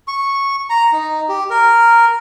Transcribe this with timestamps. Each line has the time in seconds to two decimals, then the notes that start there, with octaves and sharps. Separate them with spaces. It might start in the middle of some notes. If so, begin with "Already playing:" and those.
0.08 C#6
0.70 A#5
0.93 D#4
1.29 G4
1.50 A#4